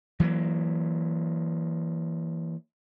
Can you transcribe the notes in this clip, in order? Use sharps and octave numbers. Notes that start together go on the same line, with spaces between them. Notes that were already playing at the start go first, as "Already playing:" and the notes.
E3 F#3 G#3 A#3